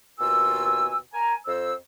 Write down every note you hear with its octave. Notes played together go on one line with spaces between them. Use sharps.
D#2 B2 F4 A#4 G#5 E6
A#4 G#5 A#5
F2 C5 E6